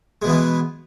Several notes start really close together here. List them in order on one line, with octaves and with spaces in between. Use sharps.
G#3 B2 E3 B3